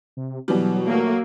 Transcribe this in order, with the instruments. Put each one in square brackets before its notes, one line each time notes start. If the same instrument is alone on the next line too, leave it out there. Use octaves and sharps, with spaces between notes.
[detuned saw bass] C3
[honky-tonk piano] B2 E3 G3 [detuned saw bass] F#3
[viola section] F#3 A#3 [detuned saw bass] A3